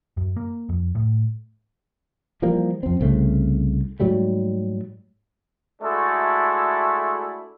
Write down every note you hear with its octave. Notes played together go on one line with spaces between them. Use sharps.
F#2
A#3
F2
A2
E3 F3 G3 A#3
F2 C4
C2 C#3 A3 C4
G#2 F#3 G3 A3
G#3 A3 D4 E4 F#4 A4